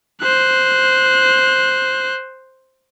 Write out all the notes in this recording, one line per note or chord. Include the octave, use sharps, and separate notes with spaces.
C5 F#6